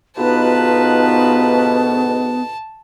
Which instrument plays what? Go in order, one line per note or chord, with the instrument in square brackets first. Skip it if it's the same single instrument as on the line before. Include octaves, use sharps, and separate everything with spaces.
[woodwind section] D2 G#2 B2 [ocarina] B3 [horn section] D#4 F4 B4 [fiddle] A5